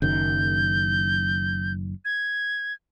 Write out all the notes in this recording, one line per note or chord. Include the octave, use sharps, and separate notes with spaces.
F#1 F#2 D#3 G6
G#6